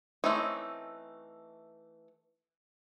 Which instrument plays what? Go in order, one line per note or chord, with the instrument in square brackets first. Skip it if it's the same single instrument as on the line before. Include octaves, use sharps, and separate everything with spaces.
[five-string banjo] E3 A3 C4 C#4 D#4